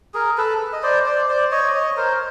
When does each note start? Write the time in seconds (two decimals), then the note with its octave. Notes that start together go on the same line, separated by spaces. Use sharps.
0.14 G#4 A#4
0.38 A4 B4
0.73 D#5
0.83 C5 D5
1.06 C5 D5
1.29 C5 D5
1.52 C#5 D#5
1.74 C#5 D#5
1.97 A#4 C5